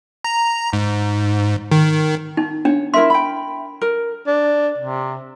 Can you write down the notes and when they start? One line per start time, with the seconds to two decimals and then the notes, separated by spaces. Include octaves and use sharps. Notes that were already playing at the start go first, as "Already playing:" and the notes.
0.24 A#5
0.73 G#2
1.71 D#3
2.37 D#4
2.65 D4 C#5
2.94 E4 A#4 E5 C6
3.10 G5 B5
3.81 A#4
4.27 D4
4.78 C3